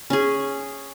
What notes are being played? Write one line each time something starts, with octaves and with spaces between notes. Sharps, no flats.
C#4 G#4